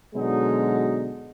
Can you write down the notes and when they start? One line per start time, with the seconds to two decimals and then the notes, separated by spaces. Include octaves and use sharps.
0.15 B2 D3 F#3 G#3 D#4